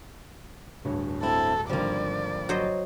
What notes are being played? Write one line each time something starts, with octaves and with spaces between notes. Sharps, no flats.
D1 G2 C#5
C4 E4 A4
G#1 D3 F3 G3 A#3 D5
F#3 C5 D#5